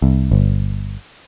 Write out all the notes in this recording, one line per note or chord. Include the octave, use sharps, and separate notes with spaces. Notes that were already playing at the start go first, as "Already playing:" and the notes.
C2
G1